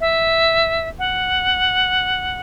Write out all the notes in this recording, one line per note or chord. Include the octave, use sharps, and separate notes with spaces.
E5
F#5